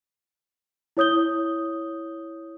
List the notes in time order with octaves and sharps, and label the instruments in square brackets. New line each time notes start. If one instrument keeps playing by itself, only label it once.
[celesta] E4 C#5 D#6 G6 G7